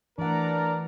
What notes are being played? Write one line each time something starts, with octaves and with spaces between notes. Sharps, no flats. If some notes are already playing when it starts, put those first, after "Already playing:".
E3 A3 D4 A#4 D5 F#5 A#5